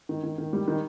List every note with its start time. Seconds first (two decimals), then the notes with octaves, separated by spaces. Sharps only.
0.09 D#3
0.23 D#3
0.38 D#3
0.53 G3
0.68 D#3